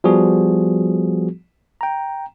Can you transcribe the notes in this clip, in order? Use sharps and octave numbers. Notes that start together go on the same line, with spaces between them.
F3 G3 B3 F#4 G#4
G5 A#5